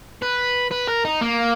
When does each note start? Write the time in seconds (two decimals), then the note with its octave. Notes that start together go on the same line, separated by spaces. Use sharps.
0.22 B4
0.71 B4
0.88 A#4
1.05 D#4
1.21 A#3